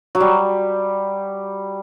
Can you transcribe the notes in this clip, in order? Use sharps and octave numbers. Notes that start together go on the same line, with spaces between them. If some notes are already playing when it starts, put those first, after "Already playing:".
F#3
G3